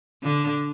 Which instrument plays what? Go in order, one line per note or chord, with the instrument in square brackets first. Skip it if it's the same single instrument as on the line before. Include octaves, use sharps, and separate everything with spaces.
[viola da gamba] D3